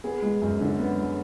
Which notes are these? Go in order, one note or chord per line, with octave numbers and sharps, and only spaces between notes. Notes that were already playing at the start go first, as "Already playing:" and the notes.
B3 G#4
G#3
F#2
D3
B3
G#3